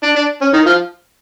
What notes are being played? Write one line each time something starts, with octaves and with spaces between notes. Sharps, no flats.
D4
D4
C#4
D#3 D#4
F3 F4